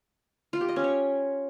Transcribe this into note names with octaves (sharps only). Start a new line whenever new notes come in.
F4
G4
D#5
C#4
C#5